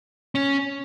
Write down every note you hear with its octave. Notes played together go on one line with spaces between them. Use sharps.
C#4